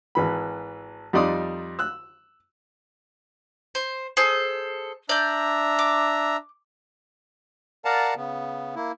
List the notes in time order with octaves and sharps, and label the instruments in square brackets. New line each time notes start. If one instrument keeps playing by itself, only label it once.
[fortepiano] G#1 E3 B5
F2 G3 D#4 D5 C6 D#6
E6 F#6
[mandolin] C5
G#4 A4 C5
[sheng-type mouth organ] D4 E5 A#5 [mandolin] D5 G6
[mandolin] D6
[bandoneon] A#4 D5 F5 F#5 A5 A#5
C#3 B3
A#3 E4